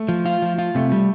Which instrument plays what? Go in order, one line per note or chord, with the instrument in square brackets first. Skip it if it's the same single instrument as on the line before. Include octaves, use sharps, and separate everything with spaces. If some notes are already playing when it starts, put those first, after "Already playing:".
Already playing: [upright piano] A3
[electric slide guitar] F3
F4
F3
F4
[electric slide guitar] C3 [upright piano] A3
[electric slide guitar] G3